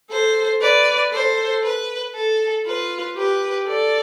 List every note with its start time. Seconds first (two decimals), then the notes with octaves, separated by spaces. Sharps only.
0.11 A4 C5
0.61 B4 D5
1.12 A4 C5
1.63 B4
2.15 A4
2.66 F4 B4
3.16 G4 B4
3.68 A4 D5